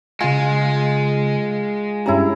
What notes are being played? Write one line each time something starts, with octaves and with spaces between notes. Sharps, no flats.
C#3 G#3 F4 G#5
G2 C#4 E4 G4 A#5